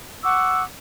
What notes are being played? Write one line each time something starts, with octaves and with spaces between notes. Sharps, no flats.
F#5 C#6 D6 E6